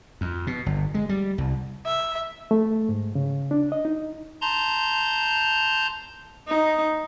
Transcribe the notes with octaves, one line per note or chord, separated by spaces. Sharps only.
F2
B2
G1
G#3
G3
C2
E5
A3
G#2
C#3
D4
D#5
D#4
A5 A#5 C6 G6
D#4